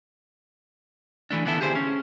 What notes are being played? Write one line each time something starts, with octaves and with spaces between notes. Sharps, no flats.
E3 A3 D4
D3 B3 E4 A4
G4 G#4 C5
C#4